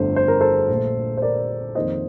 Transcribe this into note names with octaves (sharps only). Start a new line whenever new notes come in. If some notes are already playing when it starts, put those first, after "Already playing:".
Already playing: G1 F2 D3 A3 C5
C5
A#4
A4 C5
A#1 A#2 A3
C5
A#4 D5
F2 D#3 A#3 C5 D#5